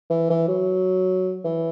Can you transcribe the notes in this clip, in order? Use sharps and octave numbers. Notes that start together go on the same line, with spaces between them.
E3
E3
F#3
E3